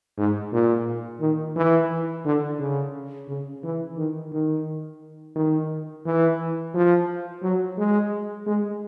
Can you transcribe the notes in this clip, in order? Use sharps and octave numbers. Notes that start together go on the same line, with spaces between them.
G#2
A#2
D#3
E3
D3
C#3
C#3
E3
D#3
D#3
D#3
E3
F3
F#3
G#3
G#3